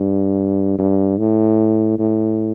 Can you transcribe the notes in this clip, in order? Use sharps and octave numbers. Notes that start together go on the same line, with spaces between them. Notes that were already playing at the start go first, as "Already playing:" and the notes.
Already playing: G2
G2
A2
A2